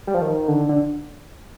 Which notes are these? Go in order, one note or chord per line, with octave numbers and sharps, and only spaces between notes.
G3
F3
D#3
D3
D3